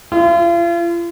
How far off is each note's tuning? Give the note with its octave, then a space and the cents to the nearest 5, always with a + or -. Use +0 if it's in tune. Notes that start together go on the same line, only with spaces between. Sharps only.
F4 -40